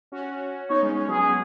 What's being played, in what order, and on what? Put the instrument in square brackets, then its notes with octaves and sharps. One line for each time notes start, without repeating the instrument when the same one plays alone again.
[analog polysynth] C#4 F#4
[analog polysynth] B3 D#4 [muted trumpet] C#5
[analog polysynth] G#3 C#4
G#3 C#4
[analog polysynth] F#3 B3 [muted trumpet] G#4
[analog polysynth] G#3 C#4
F#3 B3